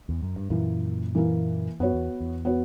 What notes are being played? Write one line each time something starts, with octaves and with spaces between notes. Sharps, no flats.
E2
F#2
G2
F#2 A#2 E3 A#3 E4
E3 A#3 E4
F#2 B3 F#4 C#5
E2
E2
B3 F#4 C#5